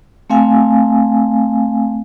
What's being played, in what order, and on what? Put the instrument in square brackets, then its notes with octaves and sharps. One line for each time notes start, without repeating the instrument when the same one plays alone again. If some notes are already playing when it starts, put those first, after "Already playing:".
[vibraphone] A3 C4 F5 G#5